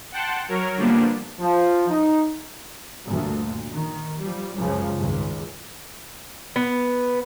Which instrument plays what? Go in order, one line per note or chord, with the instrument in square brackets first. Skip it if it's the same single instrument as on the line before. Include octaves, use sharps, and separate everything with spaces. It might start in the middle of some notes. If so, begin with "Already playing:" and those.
[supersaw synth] F#5 G5 A5 C6 C#7
F#3 A#4 C#5
D3 F3 G3 A#3 B3 D4
[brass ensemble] F3
D#4
[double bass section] D2 G2 A#2
D#3
F3 G3
C#2 F#2 C#3 F3
G#1 C#2
[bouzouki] B3